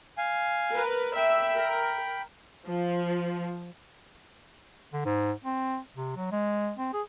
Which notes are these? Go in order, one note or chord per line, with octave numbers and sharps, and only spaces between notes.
F5 G#5
A#4 B4
E5 G5 B5
A#4
F3
D3
G#2
C4
C3
F#3
G#3
C4
G#4